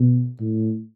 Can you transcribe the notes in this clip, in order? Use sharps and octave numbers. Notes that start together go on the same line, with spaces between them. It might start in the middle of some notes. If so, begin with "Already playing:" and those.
Already playing: B2
A2